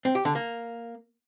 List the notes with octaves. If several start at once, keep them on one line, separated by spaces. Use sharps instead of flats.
C4
G4
D3
A#3